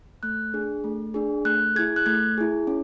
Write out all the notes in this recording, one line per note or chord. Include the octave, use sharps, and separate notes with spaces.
A3 F#6
D4 G#4
A3
D4 G#4
A3 F#6
E4 G#4 G#6
F#6
A3 G#6
E4 G#4
C#4